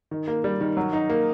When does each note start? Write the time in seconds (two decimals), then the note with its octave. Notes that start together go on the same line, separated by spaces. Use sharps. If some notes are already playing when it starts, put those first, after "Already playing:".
0.11 D#3
0.28 A#3
0.44 G3
0.61 D#3
0.77 F#3
0.93 D#4
1.10 A#3